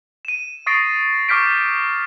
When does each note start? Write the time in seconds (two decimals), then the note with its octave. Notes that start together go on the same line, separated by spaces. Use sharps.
0.25 D#7 E7
0.66 C#6 D#6 A6 A#6 C7 D7
1.29 C#6 D6 F6 G6 B6 D7